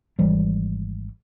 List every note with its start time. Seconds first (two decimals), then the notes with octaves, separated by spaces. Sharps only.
0.19 G#1 E3 G3